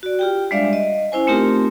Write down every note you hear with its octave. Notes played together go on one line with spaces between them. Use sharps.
F#4 D5
F4 G4 G5
G3 G#3 D4 D5 E5 F5
D#5
C#4 E4 C5 G#5
A3 C4 D#4 F4 G4 A#4